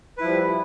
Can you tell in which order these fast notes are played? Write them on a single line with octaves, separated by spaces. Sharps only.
B4 E4 F3 G3